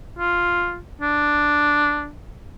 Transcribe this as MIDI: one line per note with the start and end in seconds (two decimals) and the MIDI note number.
0.19 0.78 65
1.02 2.10 62